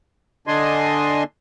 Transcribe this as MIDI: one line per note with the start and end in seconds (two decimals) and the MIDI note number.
0.47 1.23 50
0.47 1.23 62
0.47 1.23 75
0.47 1.23 80
0.47 1.23 84